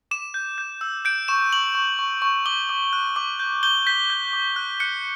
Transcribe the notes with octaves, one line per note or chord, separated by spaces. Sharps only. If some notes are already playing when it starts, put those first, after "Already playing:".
D6 E7
G6
G6
E6
G6 D7
C#6 E7
C#6 F#7
C#6
C#6
C#6
D6 G7
D6
F#6
D6
G6
G6 G7
G6 B6
G6
D6
F#6
F#6 C#7